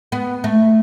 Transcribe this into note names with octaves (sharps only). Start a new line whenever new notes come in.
B3
A3